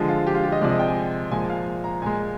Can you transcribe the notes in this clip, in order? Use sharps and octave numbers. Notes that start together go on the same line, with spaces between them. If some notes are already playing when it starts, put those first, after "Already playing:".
Already playing: D3 F3 G#3
F4
G4
F4
G4
D#5
C3 F3 G#3 D5
D#5
G5
G#5
A#2 F3 G#3 G#5
F5
A#5
A#2 G#3 G#5